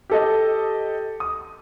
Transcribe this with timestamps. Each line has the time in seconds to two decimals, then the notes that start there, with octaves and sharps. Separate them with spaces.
0.10 G4 A4 D#5
1.20 D#6